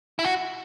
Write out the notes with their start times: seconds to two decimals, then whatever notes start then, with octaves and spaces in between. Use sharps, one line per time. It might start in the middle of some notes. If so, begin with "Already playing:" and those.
0.19 E4
0.25 F#4